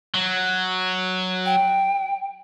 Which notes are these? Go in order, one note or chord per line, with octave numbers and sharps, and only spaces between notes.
F#3
G5